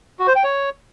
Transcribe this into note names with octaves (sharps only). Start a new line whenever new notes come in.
F#4
C5
G5
C#5